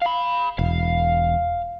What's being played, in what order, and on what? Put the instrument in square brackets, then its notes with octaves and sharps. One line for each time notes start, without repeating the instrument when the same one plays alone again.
[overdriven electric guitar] F5 B5
[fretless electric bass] E1 [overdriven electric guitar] F5